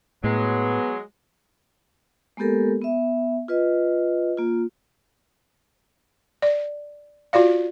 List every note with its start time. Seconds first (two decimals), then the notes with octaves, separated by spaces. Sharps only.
0.24 A2 F#3 G#3 B3
2.37 G#3 A#3 B3 G4 A4 A#4
2.82 B3 E5
3.48 F4 B4 D#5
4.37 A#3 F4
6.42 D5
7.33 F4 F#4 D5 F5